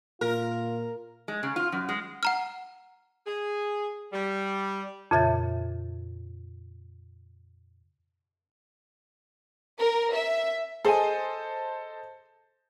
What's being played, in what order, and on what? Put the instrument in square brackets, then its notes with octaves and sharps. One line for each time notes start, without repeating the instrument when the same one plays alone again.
[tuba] A#2 [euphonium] F4 [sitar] A#4
[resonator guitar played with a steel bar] G#3
C#3
F4
F#2
G#3
[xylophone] F#5 A#5 F6
[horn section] G#4
G3
[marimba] F2 A#2 C#3 E5 G6 A6
[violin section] A#4
E5
[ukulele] G#4 G#5 [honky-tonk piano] A4 C5 D#5